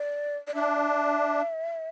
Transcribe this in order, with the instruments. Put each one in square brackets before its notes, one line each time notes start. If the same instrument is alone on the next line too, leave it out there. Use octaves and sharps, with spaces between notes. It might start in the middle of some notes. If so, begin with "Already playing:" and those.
Already playing: [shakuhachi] D5
D5
[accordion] D4 [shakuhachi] E5